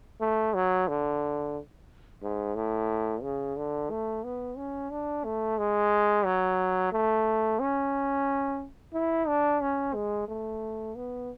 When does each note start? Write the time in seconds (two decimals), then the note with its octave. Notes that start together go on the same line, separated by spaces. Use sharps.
0.20 A3
0.54 F#3
0.88 D3
2.22 G#2
2.55 A2
3.22 C#3
3.57 D3
3.90 A3
4.24 B3
4.57 C#4
4.91 D4
5.25 A3
5.58 G#3
6.25 F#3
6.92 A3
7.60 C#4
8.94 E4
9.28 D4
9.61 C#4
9.94 G#3
10.28 A3
10.95 B3